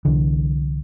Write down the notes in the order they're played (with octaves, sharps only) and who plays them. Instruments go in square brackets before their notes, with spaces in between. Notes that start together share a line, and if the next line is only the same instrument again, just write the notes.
[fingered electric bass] C2 D3 E3